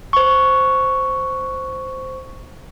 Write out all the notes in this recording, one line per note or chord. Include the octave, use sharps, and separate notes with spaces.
C5 C#6